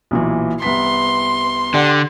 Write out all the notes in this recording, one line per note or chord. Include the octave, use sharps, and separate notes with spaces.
B1 A#2 E3
C2 B3 C6 B6
D3 G4 D5 F#5